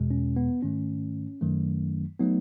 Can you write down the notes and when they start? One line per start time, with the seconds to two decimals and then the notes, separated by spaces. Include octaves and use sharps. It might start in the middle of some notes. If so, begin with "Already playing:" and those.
Already playing: E2 B2 G#3
0.11 C#4
0.36 B3
0.62 G#2 D#3 A3 C#4
1.41 F#2 D#3 F#3 A3
2.20 F#3 A3 B3 D#4